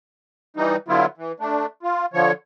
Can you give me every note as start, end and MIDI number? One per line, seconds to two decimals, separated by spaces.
0.57 0.76 52
0.57 0.76 55
0.57 0.76 63
0.88 1.06 50
0.88 1.06 54
0.88 1.06 59
0.88 1.06 64
0.88 1.06 65
1.18 1.32 52
1.40 1.66 57
1.40 1.66 62
1.83 2.06 65
2.13 2.32 50
2.13 2.32 53
2.13 2.32 73